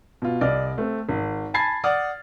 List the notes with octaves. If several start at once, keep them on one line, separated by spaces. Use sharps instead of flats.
B2 F4
C2 D5 D#5 F6
A3 C4
G#1
G#5 A5 B5 G#6 A6 C7
D5 F#5 D#6 F6